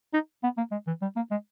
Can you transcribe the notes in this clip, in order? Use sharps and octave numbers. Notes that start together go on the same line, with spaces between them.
D#4
B3
A#3
G#3
E3
G3
A#3
G#3